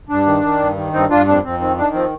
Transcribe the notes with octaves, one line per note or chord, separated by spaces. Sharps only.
G2 D4
D#3
D#3
G2
D#3
G2 C4 D#4
G2 D4 F4
F2 D4
F2 C4
D#3 C4
D#3 D4
F3 C4